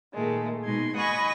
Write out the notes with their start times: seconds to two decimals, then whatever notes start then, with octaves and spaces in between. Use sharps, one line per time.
0.13 A#2 D#3 G#3 A3
0.63 B2 G#3 D#4 C6 G#6
0.95 D#5 F#5 G#5 B5 C#6 D#6